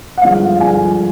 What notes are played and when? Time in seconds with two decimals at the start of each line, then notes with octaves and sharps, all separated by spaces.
0.17 F#5
0.22 G2 D3 F3 G#3 F5
0.59 G2 D3 F3 G#3 G#5